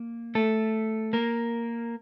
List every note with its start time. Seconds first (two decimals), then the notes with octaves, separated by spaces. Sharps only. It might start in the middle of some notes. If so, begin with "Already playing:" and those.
Already playing: A#3
0.35 A3 A4
1.13 A#3 A#4